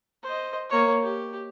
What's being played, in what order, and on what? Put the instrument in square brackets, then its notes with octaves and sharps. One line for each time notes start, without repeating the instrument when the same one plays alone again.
[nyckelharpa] C5 D#5
A#3 C#5
G4